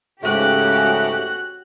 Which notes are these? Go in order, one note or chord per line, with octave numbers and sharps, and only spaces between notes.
G#2 C#3 A3 C#4 F#4 G4 F#6